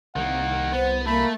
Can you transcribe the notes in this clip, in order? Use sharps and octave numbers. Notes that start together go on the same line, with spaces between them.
C2 D#3 A#3 F#5
B3 C5
A3 A#3 B5